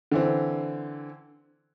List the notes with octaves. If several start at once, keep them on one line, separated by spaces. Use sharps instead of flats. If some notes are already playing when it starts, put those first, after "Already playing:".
D3 E3 C4